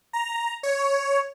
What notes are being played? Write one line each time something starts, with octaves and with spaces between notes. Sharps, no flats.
A#5
C#5